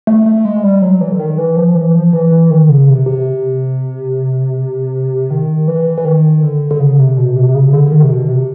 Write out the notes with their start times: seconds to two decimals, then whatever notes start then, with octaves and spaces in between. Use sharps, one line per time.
0.07 A3
0.26 A3
0.45 G#3
0.63 G3
0.82 F#3
1.01 E3
1.11 D3
1.19 D#3
1.38 E3
1.57 F3
1.75 E3
1.95 F3
2.13 E3
2.31 E3
2.50 D#3
2.68 C#3
2.88 C3
3.06 C3
5.30 D#3
5.68 E3
5.98 E3
6.05 D#3
6.43 D3
6.71 D3
6.80 C#3
6.98 C3
7.17 B2
7.36 C3
7.49 C3
7.54 C#3
7.73 D3
7.88 D3
7.91 D#3
8.02 C3
8.11 B2
8.29 C3